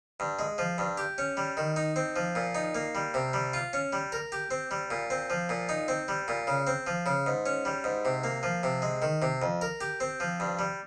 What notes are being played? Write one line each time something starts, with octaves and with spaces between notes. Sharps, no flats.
G2
G#3
F3
G2
G4
C#4
G3
D#3
D#4
C4
F3
A#2
D#4
A#3
G3
C3
G3
F4
C#4
G3
A#4
G4
C4
G3
A#2
C4
F3
A#2
D#4
C4
G3
A#2
C#3
C4
F3
C#3
G#2
C#4
G3
G#2
C3
A#3
F3
C3
G#3
D#3
C3
F2
A#4
G4
C4
F3
G2
G3